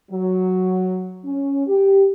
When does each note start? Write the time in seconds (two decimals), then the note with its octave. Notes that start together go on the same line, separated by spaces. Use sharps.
0.11 F#3
1.25 C#4
1.67 G4